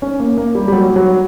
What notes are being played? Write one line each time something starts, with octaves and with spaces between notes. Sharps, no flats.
C#4
A#3
A#3
G3
G3
F#3
F#3